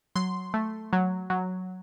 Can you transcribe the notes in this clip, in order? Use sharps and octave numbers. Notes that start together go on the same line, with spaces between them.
F#3 C6
A3
F#3
F#3